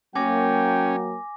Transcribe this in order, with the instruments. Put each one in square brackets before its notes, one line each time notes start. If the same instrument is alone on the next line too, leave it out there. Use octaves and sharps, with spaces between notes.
[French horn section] F#3 A#3 [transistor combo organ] C#4 [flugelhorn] G5 [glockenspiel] G#5 D6 A#6